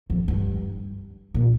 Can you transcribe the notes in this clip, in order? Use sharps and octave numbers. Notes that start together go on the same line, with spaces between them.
F2
G2
A#2